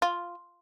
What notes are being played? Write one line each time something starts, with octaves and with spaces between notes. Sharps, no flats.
F4